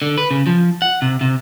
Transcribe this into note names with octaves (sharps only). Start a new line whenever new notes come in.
D3
B4
C#3
F3
F#5
C3
C3